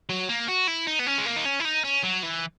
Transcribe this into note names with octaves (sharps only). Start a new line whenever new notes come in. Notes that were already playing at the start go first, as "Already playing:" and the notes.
F#3
A#3
F#4
E4
D#4
B3
C#4
G#3
A#3
D#4
C#4
E4
D#4
C#4
F#3
E3